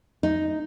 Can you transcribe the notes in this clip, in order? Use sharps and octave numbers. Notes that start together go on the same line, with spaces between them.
D#4